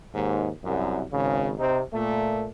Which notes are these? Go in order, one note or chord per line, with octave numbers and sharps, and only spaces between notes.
D#2 G#2
C2 F#2
G#1 C#3
C3 C4 D#4
A#2 A3